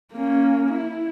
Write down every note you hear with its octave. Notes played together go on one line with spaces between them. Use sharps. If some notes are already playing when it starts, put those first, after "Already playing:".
A#3 C#4
E4